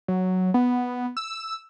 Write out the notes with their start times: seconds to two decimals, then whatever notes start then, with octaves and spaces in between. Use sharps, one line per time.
0.08 F#3
0.54 B3
1.17 E6